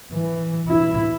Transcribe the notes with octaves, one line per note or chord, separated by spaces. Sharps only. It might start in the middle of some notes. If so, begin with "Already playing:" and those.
E3
E4